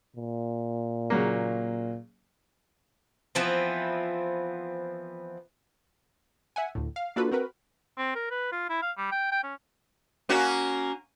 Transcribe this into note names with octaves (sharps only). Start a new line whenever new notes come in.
A#2
C#3 F#3 A#3
E3 F3 B3 C4
E5 F#5 G#5
D2 A2
F5
A#3 D4 F4 F#4 A4 B4
C4 F#4 A#4 B4
C4
A#4
B4
F4
E4
F5
G3
G5
G5
C#4
A#3 C#4 F#4